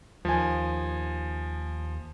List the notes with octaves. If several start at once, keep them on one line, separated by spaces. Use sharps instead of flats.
D#2 F3 G#5